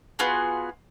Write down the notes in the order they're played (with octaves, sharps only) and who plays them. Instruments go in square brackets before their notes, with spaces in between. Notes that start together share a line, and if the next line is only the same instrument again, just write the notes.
[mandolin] B3 F4 F#4 G#4